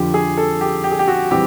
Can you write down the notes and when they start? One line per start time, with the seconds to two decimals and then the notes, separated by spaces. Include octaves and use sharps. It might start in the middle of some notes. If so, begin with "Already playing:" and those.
Already playing: F2 D3 F3 G4
0.14 G#4
0.38 A4
0.61 G4
0.84 G4
0.92 G#4
0.99 G4
1.08 F#4
1.31 E3 G3 C4 G4